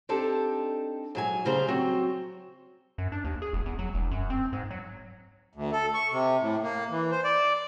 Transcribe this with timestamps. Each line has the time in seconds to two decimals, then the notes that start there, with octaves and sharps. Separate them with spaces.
0.09 C4 D4 D#4 G4 A4
1.15 G#2 F#3 G#5
1.45 D2 C#3 G3 C5 A#5
1.68 F#3 C4 F#4
2.98 F#2
3.12 D4
3.24 D#2
3.42 G#4
3.53 E1
3.66 E2
3.79 F#3
3.94 E1
4.11 F#2
4.30 C4
4.53 G#2
4.71 F#3
5.54 D2
5.72 A4
5.94 C#6
6.12 C3
6.41 A2
6.63 A#3
6.90 E3
7.11 C5
7.24 D5